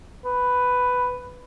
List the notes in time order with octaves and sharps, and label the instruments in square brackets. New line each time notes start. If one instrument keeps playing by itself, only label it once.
[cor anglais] B4